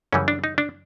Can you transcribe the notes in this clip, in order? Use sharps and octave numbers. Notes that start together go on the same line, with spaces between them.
F#2 C#3 E3 G3 C#4
D4
D#4
D4